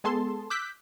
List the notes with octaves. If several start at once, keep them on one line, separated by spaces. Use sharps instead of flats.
G#3 B3 G#4 A4 A5 C6
D6 E6 F#6 G6 B6